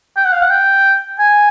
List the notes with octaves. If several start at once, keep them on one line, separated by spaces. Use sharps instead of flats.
G5
F#5
F5
F#5
G5
G#5